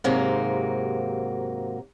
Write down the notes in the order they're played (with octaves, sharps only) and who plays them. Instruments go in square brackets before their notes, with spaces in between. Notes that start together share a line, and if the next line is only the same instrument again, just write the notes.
[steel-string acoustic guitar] D#2 G#2 C3 F#3 A#3